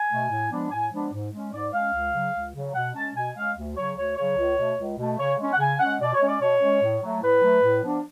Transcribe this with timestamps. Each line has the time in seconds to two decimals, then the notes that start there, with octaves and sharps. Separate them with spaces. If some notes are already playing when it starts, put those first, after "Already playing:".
Already playing: G#5
0.10 B2 A3
0.30 A2
0.50 F3 G#3 B3 D4
0.71 A2 G#5
0.92 F3 G#3 B3 D4
1.12 G#2
1.32 G#3 C#4
1.53 G#2 D5
1.72 G#3 C#4 F5
1.93 C#2
2.13 C#3 F#3
2.34 C#2
2.54 C#3 F#3
2.74 B2 F#5
2.95 G#3 C#4 A5
3.15 B2 G#5
3.36 G#3 C#4 F5
3.57 D2
3.76 C#3 F#3 C#5
3.97 D2 C#5
4.16 C#3 F#3 C#5
4.37 C#2
4.58 B2 A3
4.79 C#2
4.98 B2 A3
5.19 C#3 C#5
5.38 G#3 C#4
5.53 F#5
5.59 C#3 G#5
5.79 G#3 C#4 F#5
6.00 B2 D5
6.14 C#5
6.20 G#3 C#4
6.27 D5
6.41 B2 C#5
6.61 G#3 C#4
6.81 A2
7.02 F#3 A3
7.22 A2 B4
7.42 F#3 A3
7.63 A2
7.83 F3 B3 D4